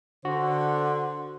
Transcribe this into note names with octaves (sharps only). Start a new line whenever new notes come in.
D3 F#4 C5